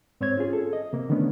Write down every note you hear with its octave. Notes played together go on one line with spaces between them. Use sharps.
G#2 C4 C5 C#5 G#6
C#4 F4 G#4
A4
D#5
C3 A#3
D3 D#3 A3 B3 C#4 D4